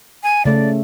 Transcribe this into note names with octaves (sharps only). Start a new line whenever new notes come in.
G#5
C#3 A3 D5